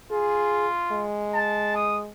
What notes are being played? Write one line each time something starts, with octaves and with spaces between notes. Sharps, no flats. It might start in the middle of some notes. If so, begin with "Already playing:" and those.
F4 G#4
G#3
A5
D#6